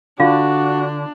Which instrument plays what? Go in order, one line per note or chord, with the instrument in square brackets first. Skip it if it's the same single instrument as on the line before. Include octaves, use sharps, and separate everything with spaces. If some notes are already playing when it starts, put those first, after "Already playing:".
[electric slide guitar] D3 [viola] D4 [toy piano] F4 F5 [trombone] F#4